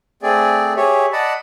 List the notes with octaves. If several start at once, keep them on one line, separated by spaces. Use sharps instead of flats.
A3 C4 G#4 D5
G4 G#4 C#5 E5
D5 D#5 F#5 A5 B5